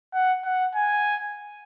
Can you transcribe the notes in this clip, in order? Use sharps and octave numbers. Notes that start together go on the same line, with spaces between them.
F#5
F#5
G#5